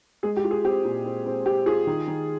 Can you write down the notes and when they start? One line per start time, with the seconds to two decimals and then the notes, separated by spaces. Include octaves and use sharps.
0.23 G#3 G#4
0.37 G4
0.44 F4
0.51 G#4
0.64 C4 G4
0.84 A#2
1.05 C4
1.26 C4
1.46 C4 G4
1.66 F4 G#4
1.87 D#3
2.08 D#3